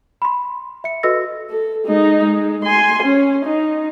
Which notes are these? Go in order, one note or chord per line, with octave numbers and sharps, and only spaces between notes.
B5 C6
E5 C#7
F#4 A4 B4 D#5 E6 A#6
A4
G#3 D#4
G#3
G#5 C6
C#4
D#4